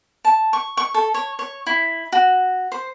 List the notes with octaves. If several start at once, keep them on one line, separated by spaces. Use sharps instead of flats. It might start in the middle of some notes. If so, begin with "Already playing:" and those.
A5
C#6
C#6
A4
C#5
C#5
E4
F#4
C5